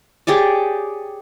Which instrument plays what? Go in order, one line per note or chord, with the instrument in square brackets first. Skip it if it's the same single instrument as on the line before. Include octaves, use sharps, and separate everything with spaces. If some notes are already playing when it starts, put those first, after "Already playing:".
[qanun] G4 G#4 C#5 D5